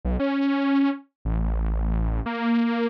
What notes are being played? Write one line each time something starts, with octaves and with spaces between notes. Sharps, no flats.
B1
C#4
A1
A1
A1
A#3